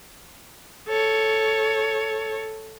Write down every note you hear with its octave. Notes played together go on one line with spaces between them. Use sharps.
A4 C#5